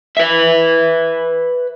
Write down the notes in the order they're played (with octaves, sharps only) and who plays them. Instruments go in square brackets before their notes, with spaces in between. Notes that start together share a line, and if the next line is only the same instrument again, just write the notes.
[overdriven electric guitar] B4 E5